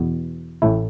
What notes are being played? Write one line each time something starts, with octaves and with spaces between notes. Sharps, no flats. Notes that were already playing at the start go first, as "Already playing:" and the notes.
Already playing: E2 B2 B3
A1 A2 A3 E4